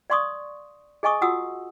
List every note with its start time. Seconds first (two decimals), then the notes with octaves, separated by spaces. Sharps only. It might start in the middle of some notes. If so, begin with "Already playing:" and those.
0.10 D5 F5 C6 C#6 D#6
1.03 G#4 D#5 G#5 C#6 D#6
1.21 F4 F#4 F#5 D#6 E6